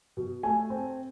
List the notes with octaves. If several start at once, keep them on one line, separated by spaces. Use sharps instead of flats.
B2
A3 G#5
C4